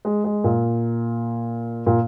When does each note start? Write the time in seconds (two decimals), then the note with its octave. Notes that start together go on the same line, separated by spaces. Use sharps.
0.05 G#3
0.24 G#3
0.44 A#2
1.86 A#2